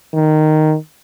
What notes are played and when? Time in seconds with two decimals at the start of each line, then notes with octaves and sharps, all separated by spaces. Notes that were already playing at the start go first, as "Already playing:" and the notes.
0.14 D#3